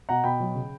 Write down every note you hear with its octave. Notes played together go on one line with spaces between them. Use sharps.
B2 F#5 A#5
B2 G5 B5
F#3
C#3